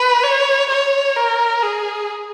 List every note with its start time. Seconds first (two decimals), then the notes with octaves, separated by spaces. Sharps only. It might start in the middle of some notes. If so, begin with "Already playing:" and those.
Already playing: B4
0.23 C#5
0.70 C#5
1.16 A#4
1.62 G#4